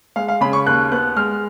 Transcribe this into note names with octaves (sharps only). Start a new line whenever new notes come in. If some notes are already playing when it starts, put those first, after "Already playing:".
G#3 F5
F5
C#3 B5
C#6
D#2 F#6
B3 F#6
G#3 F6